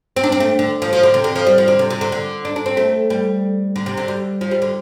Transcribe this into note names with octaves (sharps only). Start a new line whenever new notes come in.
C4
D4
C4
A3
D3
F3
F3
D3
C3
D3
F3
G3
F3
D3
C3
C3
D3
D3
D4
D4
C4
A3
G3
D3
C3
D3
G3
F3
G3
D3